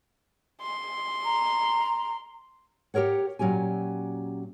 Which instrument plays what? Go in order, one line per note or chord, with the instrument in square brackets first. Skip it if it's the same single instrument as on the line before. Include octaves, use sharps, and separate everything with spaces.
[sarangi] C6
[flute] A#5
[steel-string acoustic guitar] G4 A4 A#4 C#5 F#5
A#2 F#3 C#4 G4 G#5